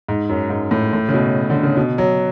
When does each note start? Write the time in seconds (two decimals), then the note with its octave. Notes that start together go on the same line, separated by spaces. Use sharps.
0.09 G#2
0.29 F#2
0.50 G#2
0.71 A2
0.93 A2
1.09 C#3
1.14 B2
1.50 D3
1.63 C#3
1.77 B2
1.98 F#3